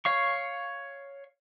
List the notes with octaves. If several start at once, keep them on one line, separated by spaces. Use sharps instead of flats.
C#5 F5 C#6